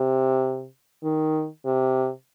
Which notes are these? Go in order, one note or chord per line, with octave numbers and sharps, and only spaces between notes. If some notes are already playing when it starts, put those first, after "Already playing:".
Already playing: C3
D#3
C3